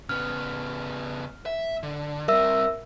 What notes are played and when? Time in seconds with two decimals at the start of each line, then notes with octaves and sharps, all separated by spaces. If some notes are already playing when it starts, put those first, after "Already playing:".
0.09 C#3 B3 F6
1.46 E5
1.83 D3
2.28 G3 C4 A#4 E5 E6